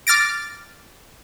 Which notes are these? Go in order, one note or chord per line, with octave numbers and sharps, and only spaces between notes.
D6 F6 A6 A#6 D7